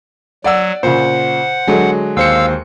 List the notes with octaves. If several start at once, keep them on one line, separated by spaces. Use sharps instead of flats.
F#3 D5 F#5 E6
A#2 C#3 C5 F#5
D3 F#3 G#3
D#2 C5 F5 E6 C#7